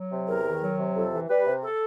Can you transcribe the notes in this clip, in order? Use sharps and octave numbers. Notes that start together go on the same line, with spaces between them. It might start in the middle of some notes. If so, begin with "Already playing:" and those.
Already playing: F#3
C3
E2 A#4
D#3
F#3
C3
F2 A4
E3
G3 B4
C3
A4